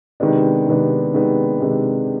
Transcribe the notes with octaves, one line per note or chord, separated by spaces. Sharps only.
C3 D#3 G#3 B3 D4
C3 D#3 G#3 B3 D4
C3 D#3 G#3 B3 D4
C3 D#3 G#3 B3 D4